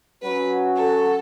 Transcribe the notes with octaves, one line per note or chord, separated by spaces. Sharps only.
F#3 C#4 F#4 B4
A4